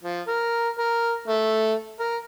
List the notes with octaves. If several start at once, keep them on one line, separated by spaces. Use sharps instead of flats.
F3
A#4
A#4
A3
A#4